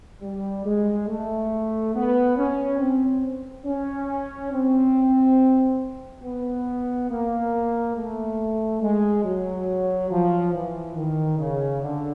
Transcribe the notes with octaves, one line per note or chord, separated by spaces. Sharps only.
G3
G#3
A3
B3
C#4
C4
C#4
C4
B3
A#3
A3
G#3
F#3
F3
E3
D#3
C#3
D3